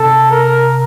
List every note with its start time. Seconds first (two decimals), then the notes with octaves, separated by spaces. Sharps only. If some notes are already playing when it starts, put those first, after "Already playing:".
Already playing: C3 A4
0.31 A#4